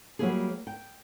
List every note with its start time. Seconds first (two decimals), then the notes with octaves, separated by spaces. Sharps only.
0.19 F#3 G3 A#3 E4 G4 G#4
0.67 G5